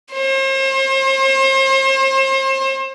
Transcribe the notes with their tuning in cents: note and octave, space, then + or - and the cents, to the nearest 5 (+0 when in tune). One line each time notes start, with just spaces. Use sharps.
C5 +40